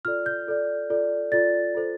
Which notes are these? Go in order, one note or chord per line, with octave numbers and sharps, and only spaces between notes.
F4 A4 D5 F6
G6
F4 A4 D5
F4 A4 D5
F4 A4 D5 A6
F4 A4 C5